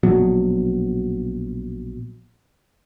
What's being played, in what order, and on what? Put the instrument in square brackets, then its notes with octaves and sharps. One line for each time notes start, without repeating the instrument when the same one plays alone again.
[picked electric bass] A#1 B2 F#3